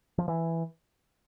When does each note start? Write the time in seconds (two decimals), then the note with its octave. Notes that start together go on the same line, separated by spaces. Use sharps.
0.18 F3
0.28 E3